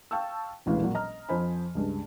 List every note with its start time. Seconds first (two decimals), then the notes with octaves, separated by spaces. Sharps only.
0.11 F5 G5 A5 C#6 E6
0.66 E1 A1 E3 F5
0.82 A#2 F#3
0.95 D#5 A#5 F6
1.29 F2 F3 C5 D#5 G#5 B5
1.75 C#2 G2